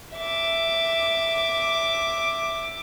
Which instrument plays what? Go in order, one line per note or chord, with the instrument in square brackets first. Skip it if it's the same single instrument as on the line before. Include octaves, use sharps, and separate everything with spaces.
[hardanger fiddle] E5 D6